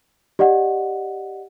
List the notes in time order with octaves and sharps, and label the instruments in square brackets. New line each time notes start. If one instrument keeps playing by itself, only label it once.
[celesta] G4 D5 D#5 F#5